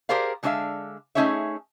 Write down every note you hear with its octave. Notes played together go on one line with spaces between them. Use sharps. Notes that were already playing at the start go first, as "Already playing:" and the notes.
G4 G#4 A#4 C5 D5 F5
D3 G#3 D4 C5 E5 F5
A3 C#4 D#4 G#4 C#5 E5